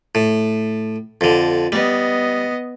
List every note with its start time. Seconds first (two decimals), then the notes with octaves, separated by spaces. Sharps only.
0.15 A2
1.21 F2 D3
1.72 G3 B3 D#5